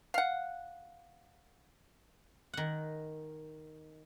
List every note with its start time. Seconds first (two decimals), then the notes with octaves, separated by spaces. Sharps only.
0.14 F5 F#5
2.53 D#3 F#5